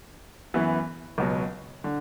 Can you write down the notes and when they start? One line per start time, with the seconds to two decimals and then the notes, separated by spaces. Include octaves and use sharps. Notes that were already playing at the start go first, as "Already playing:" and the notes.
0.54 F#2 E3 B3 E4
1.18 C#2 B2 F#3
1.84 D3